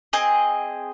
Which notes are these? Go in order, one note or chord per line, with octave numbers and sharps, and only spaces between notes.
C4 G#4 D#5